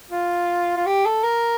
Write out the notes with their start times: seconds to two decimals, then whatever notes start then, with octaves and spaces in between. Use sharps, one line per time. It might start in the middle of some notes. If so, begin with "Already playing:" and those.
0.11 F4
0.77 F4
0.86 G4
1.05 A4
1.24 A#4